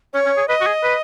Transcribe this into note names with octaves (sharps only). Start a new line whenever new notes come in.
C#4 C#5
C#4
G#4
B4 D#5
F#4
G#4
B4